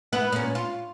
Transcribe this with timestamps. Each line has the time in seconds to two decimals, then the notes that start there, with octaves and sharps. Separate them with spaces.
0.13 B3 E4 B4
0.32 A#2 C#4
0.55 F4